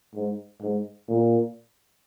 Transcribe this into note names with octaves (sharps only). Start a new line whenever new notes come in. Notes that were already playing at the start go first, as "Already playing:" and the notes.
G#2
G#2
A#2